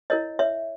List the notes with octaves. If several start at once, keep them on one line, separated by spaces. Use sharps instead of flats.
E4 A#4 C#5 D#5
C#5 E5